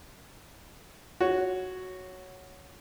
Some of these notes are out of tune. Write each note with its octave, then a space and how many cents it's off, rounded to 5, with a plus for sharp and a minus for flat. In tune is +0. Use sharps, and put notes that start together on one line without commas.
F#4 +0 C#5 +0